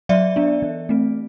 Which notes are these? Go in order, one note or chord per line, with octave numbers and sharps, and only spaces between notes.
F#3 D5 E5
B3 D4
E3
A3 C4